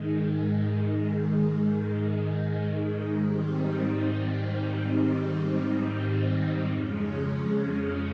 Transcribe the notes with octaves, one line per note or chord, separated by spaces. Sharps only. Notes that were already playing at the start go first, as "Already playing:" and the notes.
Already playing: G#2 D#3 G#3
G#2 D#3 G3 C4 D#4
F2 C#3 F3 G#3 C#4